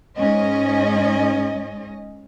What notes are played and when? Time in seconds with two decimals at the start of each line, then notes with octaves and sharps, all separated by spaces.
0.16 G#2 C#4 D#5